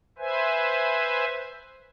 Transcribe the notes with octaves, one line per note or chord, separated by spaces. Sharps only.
B4 C5 E5 G#5